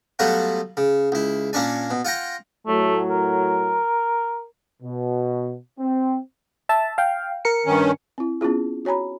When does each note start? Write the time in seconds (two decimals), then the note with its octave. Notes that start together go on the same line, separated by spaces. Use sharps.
0.19 F#3 G3 A3 B3 F4 F#4
0.77 C#3
1.12 C#2 E4
1.53 A#2 A#3 C#4 D4 G#5
1.90 B2
2.05 F4 F#5 G5 A#5
2.67 A2 F#3 A3
3.10 A#4
4.82 B2
5.79 C4
6.69 E5 A5
6.98 F5 G5
7.45 A#4 C#7
7.66 G2 D#3 C#4
8.18 C4 E4
8.41 B3 C#4 E4 F4 G#4
8.85 F#4 C#5 G#5 A#5 B5